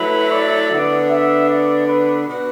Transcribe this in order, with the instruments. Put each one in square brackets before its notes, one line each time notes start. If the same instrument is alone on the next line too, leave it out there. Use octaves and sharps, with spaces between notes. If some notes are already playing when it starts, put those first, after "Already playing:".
Already playing: [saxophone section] F#3 A3 E4 [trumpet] B4
[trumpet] D5
[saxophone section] D3 B3 D4
[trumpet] E5
D5
B4
[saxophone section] B2 B3 F#4